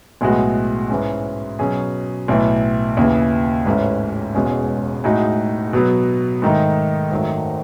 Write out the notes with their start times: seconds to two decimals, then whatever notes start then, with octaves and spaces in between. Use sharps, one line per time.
0.21 B1 A2 G#3 B3 F#4
0.89 G#2 E3 G#3 C#4
1.59 B2 F#3 C#4 G#4
2.28 B1 A2 E3
2.97 D#2 C#3 E3
3.66 A1 G#2 E3 A3 C#4
4.35 E1 E2 B2 G#3 C#4
5.04 A2 G#3 D#4 F#4
5.73 B2 F#3 B3
6.42 G#2 D#3 A3 D#4
7.11 G#1 F#2 D#3 F#3 A3